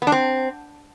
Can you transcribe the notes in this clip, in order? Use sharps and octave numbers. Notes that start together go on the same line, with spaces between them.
B3
D4
C4